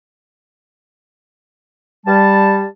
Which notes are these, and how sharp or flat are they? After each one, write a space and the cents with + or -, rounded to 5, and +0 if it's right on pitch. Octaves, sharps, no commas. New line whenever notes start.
G3 +10 A5 +0